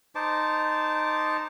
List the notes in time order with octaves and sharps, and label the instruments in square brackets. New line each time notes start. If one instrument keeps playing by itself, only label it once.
[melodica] D#4 C5 A5 D6